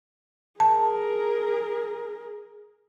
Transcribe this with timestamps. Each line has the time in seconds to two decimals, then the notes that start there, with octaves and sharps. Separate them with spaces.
0.60 G#4 A#4 A5